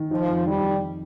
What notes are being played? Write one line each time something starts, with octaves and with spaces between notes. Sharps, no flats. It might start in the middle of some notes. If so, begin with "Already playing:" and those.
Already playing: D#3
F3 D#4
F2
D#3 G3
D#3